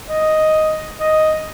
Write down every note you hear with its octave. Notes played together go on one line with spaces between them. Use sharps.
D#5
D#5